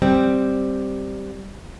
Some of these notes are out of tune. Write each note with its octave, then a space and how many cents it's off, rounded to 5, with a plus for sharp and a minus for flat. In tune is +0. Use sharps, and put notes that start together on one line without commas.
G3 +0 C4 +0